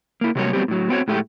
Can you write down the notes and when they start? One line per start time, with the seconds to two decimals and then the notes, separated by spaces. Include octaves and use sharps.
0.21 A#3 E4
0.35 C3 F#3 G3 A#3 C#5
0.53 F#3 G3 B3 C4 G4
0.68 A2 F#3
0.89 B3 C4 F#4 C#5
1.08 A2 G#3 A3 G4